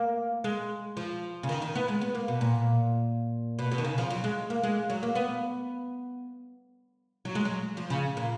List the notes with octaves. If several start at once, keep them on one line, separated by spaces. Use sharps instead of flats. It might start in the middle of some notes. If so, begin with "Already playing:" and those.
Already playing: A#3
G#3
F3
C#3
D#3
D#3
B3
G#3
B3
A#3
B2
A#2
B2
B2
D#3
C#3
F3
F#3
G#3
A#3
G#3
F#3
A#3
B3
F#3
G#3
F#3
F3
C#3
A#2